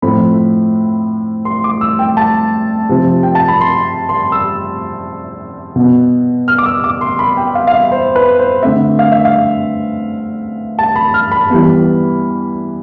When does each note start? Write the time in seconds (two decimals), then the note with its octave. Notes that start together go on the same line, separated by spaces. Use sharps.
0.02 A2 F3 A3 C4 B5
1.45 C6
1.64 D6
1.81 E6
1.99 G5
2.17 A5
2.89 C3 F3 C4
3.23 G5
3.35 A5
3.48 B5
3.61 C6
4.09 C6
4.32 E6
5.76 B2 B3
6.48 F6
6.58 D6
6.66 E6
6.84 D6
7.01 C6
7.19 B5
7.37 G5
7.55 F5
7.67 F5
7.74 E5
7.92 C5
8.16 B4
8.39 C5
8.63 D3 A3 C4 E5
8.99 F5
9.12 E5
9.25 F5
10.79 A5
10.96 B5
11.14 F6
11.32 B5
11.50 E3 G3 B3